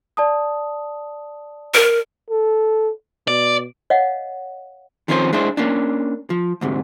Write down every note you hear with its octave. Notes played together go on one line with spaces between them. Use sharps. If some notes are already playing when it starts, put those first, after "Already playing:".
D5 A5 D#6
A#4
A4
B2 D5
C#5 D#5 F5 F#5
D#3 F3 C4 C#4 F#4 C5
G#3 D4 E4 C5
A#3 C#4 D4
F3
D2 G#2 C3